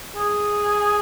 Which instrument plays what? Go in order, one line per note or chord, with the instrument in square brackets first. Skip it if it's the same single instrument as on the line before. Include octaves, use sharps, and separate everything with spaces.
[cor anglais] G#4